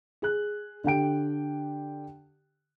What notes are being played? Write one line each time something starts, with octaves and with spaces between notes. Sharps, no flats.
G#4 F#6
D3 G4 G5 D7